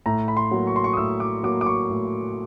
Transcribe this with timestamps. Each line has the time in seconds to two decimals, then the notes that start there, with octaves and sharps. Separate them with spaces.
0.06 A2 A#5
0.28 B5
0.37 C6
0.51 F#3 A#3
0.67 C#6
0.76 C6
0.84 C#6
0.93 D#6
0.97 A2 E6
1.20 D6
1.43 F#3 A#3 D6
1.61 D6
1.66 C#6
1.89 A2